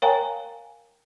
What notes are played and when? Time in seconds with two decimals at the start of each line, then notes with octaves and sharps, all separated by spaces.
0.02 A#4 C#5 F5 G5 G#5 A#5